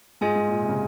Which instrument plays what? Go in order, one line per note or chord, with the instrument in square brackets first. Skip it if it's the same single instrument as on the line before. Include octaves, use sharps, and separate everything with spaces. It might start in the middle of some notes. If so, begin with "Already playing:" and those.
[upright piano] G#2 [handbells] F4 G#4 D#5 G#5
[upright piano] G#2
A#2
C3
C#3